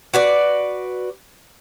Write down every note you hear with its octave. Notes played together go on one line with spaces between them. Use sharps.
F#4 B4 D5